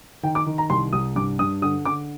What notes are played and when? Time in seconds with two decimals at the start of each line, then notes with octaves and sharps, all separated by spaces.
0.23 D#3 G5
0.35 D6
0.47 D#3
0.58 A#5
0.70 C2 C6
0.93 C2 D#6
1.16 G2 D6
1.39 G2 D#6
1.62 D3 D#6
1.85 D3 D6